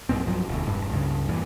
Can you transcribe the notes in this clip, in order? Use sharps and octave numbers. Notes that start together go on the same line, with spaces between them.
A#1 F#2 A#2 C4
B1 G2 F3 F#3
E1 D2
E1 G2
C#2 G2 C#3
E2 G2 A#2 E3